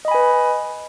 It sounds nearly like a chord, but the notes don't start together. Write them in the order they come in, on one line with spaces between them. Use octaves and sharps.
D#5 B5 G#5 B4